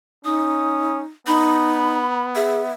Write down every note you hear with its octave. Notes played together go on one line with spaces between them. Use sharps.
C#4 D#4 D#6
B3 D#4 B5
G#4 E5